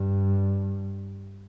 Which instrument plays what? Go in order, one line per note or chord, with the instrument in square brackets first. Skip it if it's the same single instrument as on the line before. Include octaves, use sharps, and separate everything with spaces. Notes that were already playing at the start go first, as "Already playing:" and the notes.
Already playing: [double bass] G2